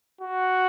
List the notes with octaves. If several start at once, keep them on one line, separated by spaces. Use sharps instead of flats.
F#4